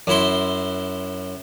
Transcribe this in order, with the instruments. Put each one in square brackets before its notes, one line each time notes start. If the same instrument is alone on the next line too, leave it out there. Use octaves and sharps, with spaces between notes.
[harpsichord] F#2 E4 C6